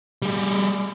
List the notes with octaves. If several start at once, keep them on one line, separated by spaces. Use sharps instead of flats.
G3 G#4